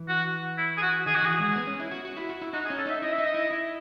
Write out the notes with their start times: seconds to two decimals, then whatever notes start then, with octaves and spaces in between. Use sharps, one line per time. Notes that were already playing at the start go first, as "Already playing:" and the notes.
Already playing: E3
0.08 F#4
0.58 E4
0.77 G#4
0.82 F#4
1.06 D#3 G#4
1.15 F#4
1.22 E3 G#4
1.39 G#3
1.56 B3
1.67 C#4
1.80 E4
1.91 F#4
2.05 F#4
2.17 E4
2.29 F#4
2.42 E4
2.53 D#4 F#4
2.65 G#4
2.70 C#4
2.78 A4
2.86 D#4 E5
3.02 E4 D#5
3.13 E5
3.18 D#4
3.24 D#5
3.34 E4
3.51 E4